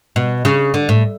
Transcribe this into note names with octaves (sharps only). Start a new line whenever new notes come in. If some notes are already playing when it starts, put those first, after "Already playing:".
B2
C#3
D3
A2